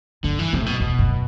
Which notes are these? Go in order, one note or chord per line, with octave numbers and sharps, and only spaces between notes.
G2 D3
E3
F#2 C3
A2
B2
E2 B2
F#2